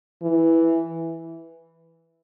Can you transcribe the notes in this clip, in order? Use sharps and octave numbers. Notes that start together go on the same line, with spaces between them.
E3